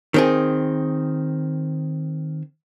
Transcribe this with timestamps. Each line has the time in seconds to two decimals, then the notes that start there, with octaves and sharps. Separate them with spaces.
0.14 D#3 C4 G#4